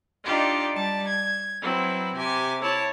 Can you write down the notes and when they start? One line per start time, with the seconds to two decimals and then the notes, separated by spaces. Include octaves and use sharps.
0.23 D4 D#4 F4 G4 D5
0.75 G3 A5
1.07 G#6
1.61 F#3 C4 E4 B4
2.15 C3 G4 G#5 D6
2.61 E4 C#5 A5